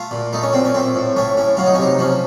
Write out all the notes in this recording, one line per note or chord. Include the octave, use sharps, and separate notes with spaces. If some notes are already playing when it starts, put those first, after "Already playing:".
Already playing: A3 F4
A#2
A3 D#4
C#4
A#2 C4
C#4
A3 C4
A2
A3 C#4
A2 C#4
F#3 F4
D#4
C#4
C3 D#4
F3 C#4